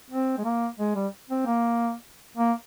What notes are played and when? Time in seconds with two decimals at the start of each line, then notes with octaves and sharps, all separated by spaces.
0.11 C4
0.38 G#3
0.45 A#3
0.79 G#3
0.96 G3
1.30 C4
1.46 A#3
2.37 A#3